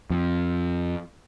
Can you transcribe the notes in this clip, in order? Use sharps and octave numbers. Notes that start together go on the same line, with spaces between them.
F2